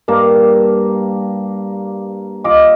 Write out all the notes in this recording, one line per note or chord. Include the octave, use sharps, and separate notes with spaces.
G2 A#3 A5
F4 D#5 D6